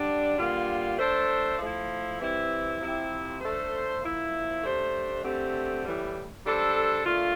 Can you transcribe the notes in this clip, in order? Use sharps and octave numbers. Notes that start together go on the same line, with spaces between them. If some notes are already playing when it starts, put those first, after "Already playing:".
Already playing: D3 G3 D4
D3 G3 A#3 F4
A3 D4 A4 C5
F3 A3 E4
E3 G3 C4 E4
C3 F3 C4 E4 G4
A3 D4 A4 C5
F3 A#3 E4
A3 D4 G4 C5
D3 A3 C4 G4
A2 E3 G3
G3 D4 A4 C5
A#2 A3 D4 F4